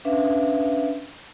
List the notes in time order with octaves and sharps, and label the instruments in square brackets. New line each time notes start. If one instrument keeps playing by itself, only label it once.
[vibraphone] C#4 D4 B4 E5 F5